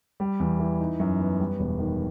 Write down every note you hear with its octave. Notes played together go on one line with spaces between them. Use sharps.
G3
E2
E3
D#4
F#2
B3
G3
E1
D#3